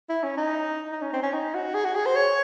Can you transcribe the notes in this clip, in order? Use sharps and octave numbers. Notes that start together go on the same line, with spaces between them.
E4
C#4
D#4
D#4
C#4
C4
C#4
D#4
F#4
G#4
F#4
G#4
C5
C#5